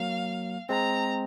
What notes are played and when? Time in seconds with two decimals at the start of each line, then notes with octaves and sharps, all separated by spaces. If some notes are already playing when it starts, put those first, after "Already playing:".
Already playing: F#3 A#3 F5
0.69 G#3 C4 A#5